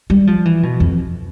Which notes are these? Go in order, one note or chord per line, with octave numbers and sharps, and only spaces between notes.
G3
F3
E3
B2
F2